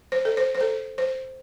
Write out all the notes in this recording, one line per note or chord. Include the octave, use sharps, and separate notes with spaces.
C5
A4
C5
C5
A4
C5